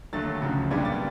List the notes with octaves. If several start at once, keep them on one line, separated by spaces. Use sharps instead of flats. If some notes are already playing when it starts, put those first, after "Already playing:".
D#2 D3 F#3 A3 A6
D2 C#3 F3
B1 A#2 G3 B3 D4 G#6
A6